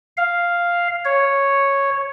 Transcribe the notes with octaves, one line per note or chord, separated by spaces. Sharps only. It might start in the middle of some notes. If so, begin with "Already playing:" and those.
F5
C#5